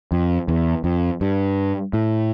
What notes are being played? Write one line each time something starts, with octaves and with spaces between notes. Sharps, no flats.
F2
E2
F2
G2
A2